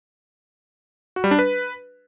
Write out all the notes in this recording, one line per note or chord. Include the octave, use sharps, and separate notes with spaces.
F#4
G3
D4
B4